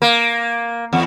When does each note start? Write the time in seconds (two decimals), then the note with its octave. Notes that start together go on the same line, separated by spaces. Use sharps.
0.02 A#3
0.93 E2